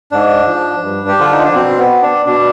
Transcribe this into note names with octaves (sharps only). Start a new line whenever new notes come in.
G#2 D4
F3
G2
G4
D3 F3 F4
D#4
D4
B2 C4
B3
D4
B2 D4